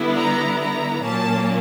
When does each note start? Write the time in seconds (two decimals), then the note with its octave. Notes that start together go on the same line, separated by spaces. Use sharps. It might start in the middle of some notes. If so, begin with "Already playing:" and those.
Already playing: D3 G3 B3 E4
0.16 A#5
0.60 A#5
1.03 A#2 F#3 A#3 C#4 A5